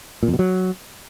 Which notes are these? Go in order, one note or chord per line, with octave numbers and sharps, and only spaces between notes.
A#2
F2
B2
F#3